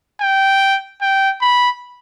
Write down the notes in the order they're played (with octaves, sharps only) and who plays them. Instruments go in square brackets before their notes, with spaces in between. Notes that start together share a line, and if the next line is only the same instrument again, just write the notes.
[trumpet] G5
G5
B5